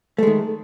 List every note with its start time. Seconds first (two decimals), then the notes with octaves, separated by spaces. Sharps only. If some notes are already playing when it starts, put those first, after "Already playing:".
0.18 A3
0.23 G#3
0.27 D#3